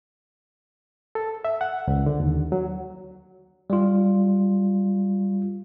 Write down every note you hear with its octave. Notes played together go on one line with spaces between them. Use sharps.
A4
E5
F#5
C#2
D3
D#2
F#3
G3 F4